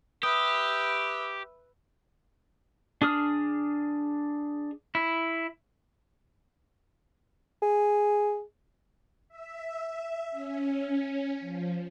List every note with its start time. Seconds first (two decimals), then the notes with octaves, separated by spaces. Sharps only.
0.23 G4 B4 E5 D#6
3.02 D4 G#4 D#6 F6
4.95 E4
7.62 G#4
9.28 E5
10.31 C#4
11.40 F3